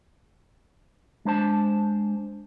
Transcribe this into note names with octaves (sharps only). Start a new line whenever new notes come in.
G#3 D4 C5 A5